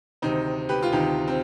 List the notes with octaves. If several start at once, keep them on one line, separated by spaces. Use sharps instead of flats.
D2 C3 D#3 C4 D#4
G4 B4
F4
D2 C3 D#3 D#4 G4
C4